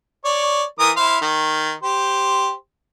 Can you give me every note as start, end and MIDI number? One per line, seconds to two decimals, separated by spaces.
0.25 0.63 73
0.25 0.63 74
0.79 0.90 52
0.79 0.90 70
0.79 0.90 87
0.97 1.17 64
0.97 1.17 72
0.97 1.17 77
1.21 1.72 51
1.83 2.52 67
1.83 2.52 72